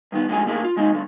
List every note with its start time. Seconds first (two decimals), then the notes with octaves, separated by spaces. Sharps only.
0.12 G2 D#3 B3
0.29 A2 D3 F3 G#3 G#5
0.46 D3 A3 A#3 E4 G#4
0.64 F4
0.76 C3 G#3 C4 D#4
0.92 D2 G2 D3